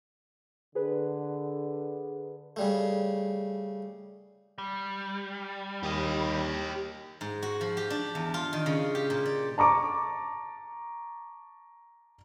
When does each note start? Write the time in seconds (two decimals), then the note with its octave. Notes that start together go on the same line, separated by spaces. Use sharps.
0.75 D3 G#4 B4
2.56 C#3 G3 A3
4.58 G3
5.83 D#2 G4 D#5
7.21 G#2
7.42 F#4
7.61 F3
7.77 G4
7.90 D4
8.15 E2
8.34 F4
8.53 D#3
8.66 C#3
8.95 G4
9.10 A#2
9.26 D5
9.58 A5 A#5 C#6 D6